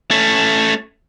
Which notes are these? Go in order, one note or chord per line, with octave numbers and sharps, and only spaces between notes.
A3 C#4